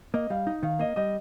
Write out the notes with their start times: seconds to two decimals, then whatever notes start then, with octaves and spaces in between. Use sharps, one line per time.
0.14 A#3 D#5
0.30 G3 F5
0.47 D#4
0.63 D#3 F5
0.79 A#3 D#5
0.96 G3 D#5